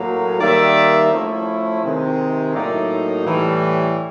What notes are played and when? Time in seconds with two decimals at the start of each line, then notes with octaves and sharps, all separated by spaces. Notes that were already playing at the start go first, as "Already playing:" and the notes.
Already playing: A2 F#3 A#3
0.40 D#3 G3 A#3 D5 E5
1.11 F3 A3 C#4 E4
1.82 C3 D#3 G#3
2.54 A2 F#3 A#3 D#4 D5 E5
3.25 A2 E3 G3